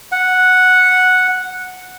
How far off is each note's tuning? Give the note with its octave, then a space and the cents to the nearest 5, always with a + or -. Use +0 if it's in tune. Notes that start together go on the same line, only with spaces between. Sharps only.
F#5 -5